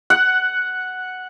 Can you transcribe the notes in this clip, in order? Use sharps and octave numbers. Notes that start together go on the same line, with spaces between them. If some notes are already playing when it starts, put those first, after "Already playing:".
F#5 F#6